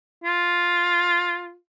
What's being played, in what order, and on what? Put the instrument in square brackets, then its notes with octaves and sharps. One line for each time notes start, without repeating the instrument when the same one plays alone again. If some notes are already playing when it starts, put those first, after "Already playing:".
[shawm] F4